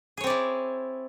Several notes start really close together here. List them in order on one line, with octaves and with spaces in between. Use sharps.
G#4 C#5 C4 D5 E4